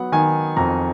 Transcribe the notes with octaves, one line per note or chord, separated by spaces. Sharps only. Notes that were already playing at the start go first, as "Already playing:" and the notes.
Already playing: F#3 B3 F#5
D#3 G#5
F2 A#5